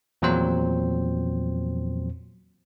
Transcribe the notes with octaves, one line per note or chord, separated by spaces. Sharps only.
E2 A#2 F3 F#3 C4 C5